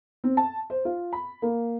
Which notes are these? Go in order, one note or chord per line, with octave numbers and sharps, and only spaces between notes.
C4
A5
C5
F4
B5
A#3